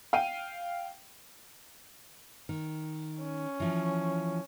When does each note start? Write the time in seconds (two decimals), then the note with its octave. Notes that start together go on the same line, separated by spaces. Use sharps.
0.13 F5 G5 D#7
2.49 D#3
3.23 C#4
3.60 E3 F3